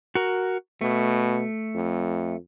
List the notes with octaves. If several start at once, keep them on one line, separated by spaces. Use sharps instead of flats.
F#4 A#4
B2 A3
F2